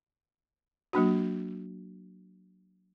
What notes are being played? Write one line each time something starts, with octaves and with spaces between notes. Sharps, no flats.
F#3 A#3 D4 F#4